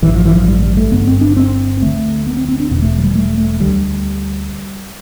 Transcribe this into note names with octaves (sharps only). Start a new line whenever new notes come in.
A1 G2 D3 E3
F3
E3
F3
G3
G3
A3
G1 G2 D3 B3
C4
D4
C4
D2 D3 A3
B3
C4
C4
D4
E1 E2 B2 B3
A3
F3
G3
A3
A3
D2 D3 G3